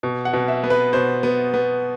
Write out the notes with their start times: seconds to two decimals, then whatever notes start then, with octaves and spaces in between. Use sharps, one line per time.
0.03 B2
0.25 F#5
0.33 B2
0.48 E5
0.63 B3
0.70 B4
0.93 B2 C5
1.23 B3
1.54 B3